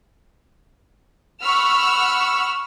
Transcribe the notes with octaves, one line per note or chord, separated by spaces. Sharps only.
F#5 B5 C#6 E6 F6